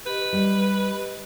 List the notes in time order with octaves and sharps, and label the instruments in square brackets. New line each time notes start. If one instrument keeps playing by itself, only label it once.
[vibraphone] G4 D#5 [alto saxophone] B4
[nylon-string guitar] G3